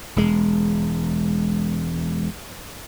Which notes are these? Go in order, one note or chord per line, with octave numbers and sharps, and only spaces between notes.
E1 G#3